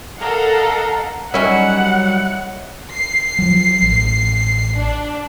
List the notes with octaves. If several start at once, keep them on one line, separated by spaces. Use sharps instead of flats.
A4 A#4 D#5 F5 F#5
D#3 F#3 G3 C#4 E4 F#4 F#5
C7
F3 F#3
A1
D4